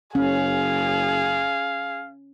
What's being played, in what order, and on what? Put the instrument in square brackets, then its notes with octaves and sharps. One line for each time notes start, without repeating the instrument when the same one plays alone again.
[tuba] F#1 [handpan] C#4 [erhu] G#4 [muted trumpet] F5